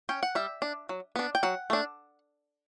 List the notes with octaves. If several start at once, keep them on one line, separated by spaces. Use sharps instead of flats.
C#4 G5
F#5
G3 E5
D4
F#3
B3 D4
G5
F#3 F#5
A3 D4